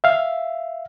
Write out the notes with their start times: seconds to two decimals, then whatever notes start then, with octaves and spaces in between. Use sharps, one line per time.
0.04 E5 F5